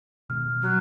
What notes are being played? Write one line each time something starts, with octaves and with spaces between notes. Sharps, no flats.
B2 D#3 G#3 F6
B2
F#3